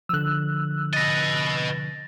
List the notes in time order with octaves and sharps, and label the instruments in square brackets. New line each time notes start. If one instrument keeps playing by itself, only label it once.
[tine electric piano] D3 F3 [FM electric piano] E6 F#6
[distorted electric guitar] B4 D#5 [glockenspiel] A6 A#6